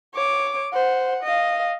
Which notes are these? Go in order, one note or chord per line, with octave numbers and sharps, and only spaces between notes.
C#5 D6
C5 F#5
D#5 F5